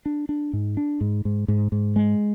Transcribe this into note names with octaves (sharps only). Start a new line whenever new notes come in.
D4
D4
G#2
D4
G#2
G#2
G#2
G#2
G#3